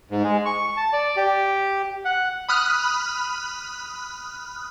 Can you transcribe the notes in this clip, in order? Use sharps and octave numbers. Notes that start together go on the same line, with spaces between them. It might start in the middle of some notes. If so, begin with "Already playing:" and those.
G#2
G#3
C#6
A5
D5
G4
F#5
B5 D#6 F6 F#6